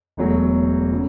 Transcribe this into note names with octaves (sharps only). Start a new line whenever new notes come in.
E1 E2 B2 F#3 A3
C#3 F#3